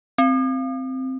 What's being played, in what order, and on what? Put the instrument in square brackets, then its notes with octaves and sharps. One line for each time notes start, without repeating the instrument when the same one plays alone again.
[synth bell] C4